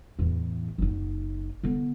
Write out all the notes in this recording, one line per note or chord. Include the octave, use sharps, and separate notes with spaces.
E2 A2
F#1 D#4
D3 B3